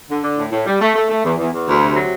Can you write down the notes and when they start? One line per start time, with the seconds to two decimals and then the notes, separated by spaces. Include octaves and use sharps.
0.09 D3
0.23 D3
0.37 A2
0.52 A2
0.66 G3
0.81 A3
0.96 A3
1.10 A3
1.24 E2
1.38 E2
1.53 E2
1.67 D2
1.82 C3
1.95 F#3